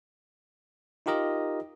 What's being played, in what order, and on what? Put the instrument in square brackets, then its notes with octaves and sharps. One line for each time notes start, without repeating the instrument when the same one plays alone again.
[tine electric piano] D#4 F4 G4 A#4 D#5